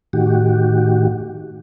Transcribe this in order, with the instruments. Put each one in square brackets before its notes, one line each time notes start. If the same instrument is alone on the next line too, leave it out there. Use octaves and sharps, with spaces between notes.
[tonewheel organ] A2 D#3 F#4 G4